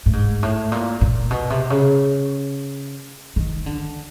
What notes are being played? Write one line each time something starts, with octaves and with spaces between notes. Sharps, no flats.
A2
G#2
A2
A#2
A#2
B2
C3
C#3
D#3
D3